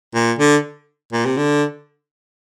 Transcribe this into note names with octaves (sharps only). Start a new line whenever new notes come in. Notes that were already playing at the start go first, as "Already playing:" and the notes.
A#2
D3
A#2
C3
D3